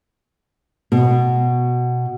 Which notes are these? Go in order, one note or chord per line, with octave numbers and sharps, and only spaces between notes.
B2